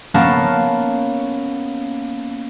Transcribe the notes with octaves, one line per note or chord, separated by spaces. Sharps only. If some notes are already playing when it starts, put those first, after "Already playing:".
A#3 B3 C#4 F5 A5